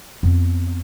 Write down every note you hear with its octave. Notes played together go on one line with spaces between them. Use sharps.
F2 B3